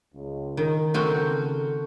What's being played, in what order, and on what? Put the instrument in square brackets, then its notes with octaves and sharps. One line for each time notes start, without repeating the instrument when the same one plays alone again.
[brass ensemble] C#2
[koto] D#3
[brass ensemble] C#3 A4 [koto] C4 F#4 A#4